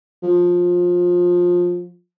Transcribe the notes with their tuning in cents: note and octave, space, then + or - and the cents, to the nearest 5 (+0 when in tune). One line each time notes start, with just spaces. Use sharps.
F3 +20